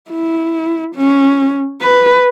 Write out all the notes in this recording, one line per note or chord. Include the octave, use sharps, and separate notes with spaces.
E4
C#4
B4